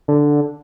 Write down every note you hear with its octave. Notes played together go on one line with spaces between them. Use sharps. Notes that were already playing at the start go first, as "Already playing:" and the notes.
D3